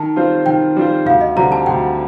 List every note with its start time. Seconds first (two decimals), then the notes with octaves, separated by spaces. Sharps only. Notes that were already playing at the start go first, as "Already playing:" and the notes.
Already playing: D#3 A5
0.16 G3 C4 F4 C5
0.46 D#3 G5
0.76 G3 C4 F4 C5
1.06 D2 F5
1.21 D#5
1.36 D3 G3 C4 A#5
1.52 A5
1.66 D2 G5